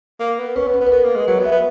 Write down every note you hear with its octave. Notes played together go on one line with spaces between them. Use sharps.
A#3
B3
C#4 B4
B3
B4
B3
B4
B3 A#4
A#3
G#3
F#3 B4
B3
E5
B3